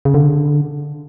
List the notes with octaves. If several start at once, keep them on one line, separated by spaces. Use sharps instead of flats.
C#3
D3